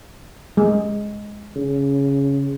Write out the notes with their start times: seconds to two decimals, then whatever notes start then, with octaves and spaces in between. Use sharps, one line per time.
0.57 G#3
1.55 C#3